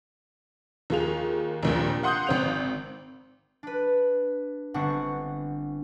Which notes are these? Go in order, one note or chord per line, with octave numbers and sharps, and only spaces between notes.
D#2 F4 G#4 F7
A#1 D#2 A#2
F5 F#5 C6 D#6 F#6 G6
G#1 C4 F7
D4 B4
G1 B3 C4 D4 F#5 C#6